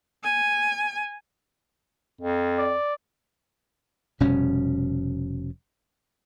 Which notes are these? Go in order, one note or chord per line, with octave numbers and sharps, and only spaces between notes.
G#5
F2
D5
F1 B2 G3 C#4